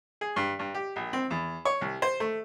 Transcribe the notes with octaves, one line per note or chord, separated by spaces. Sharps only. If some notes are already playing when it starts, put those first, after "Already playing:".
G#4
G2
G2
G4
A#1
C4
E2
C#5
C2
C5
A3